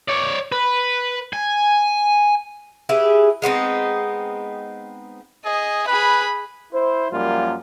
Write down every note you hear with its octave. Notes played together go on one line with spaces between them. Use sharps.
C#5 D5
B4
G#5
E4 G4 G#4 B4
G#3 B3 C4 D#4
G#4 D#5
G#4 B4 B5
E4 C5
F#2 F3 G3 A#3 F4